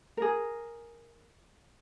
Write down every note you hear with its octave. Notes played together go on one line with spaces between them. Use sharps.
G#4 A#4